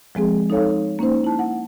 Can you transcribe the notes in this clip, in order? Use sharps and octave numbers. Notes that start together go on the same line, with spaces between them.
F3 G#3 C4 G#4
D#4 A4 C#5 F5
A#3 C#4 D#4 C5
E4 A5
F#5